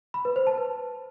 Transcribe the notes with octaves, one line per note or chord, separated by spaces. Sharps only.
B5
B4
C5
A5
B4